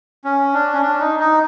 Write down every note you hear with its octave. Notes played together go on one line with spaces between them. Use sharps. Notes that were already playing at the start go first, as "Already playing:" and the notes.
C#4
D4
C#4
D4
D#4
D#4